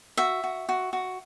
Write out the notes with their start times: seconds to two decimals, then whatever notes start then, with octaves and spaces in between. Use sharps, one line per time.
0.17 F#4 E5
0.44 F#4
0.69 F#4
0.93 F#4